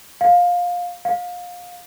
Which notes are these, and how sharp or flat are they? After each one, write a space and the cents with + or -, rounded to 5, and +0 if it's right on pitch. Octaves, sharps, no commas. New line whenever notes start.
F5 +20
F5 +30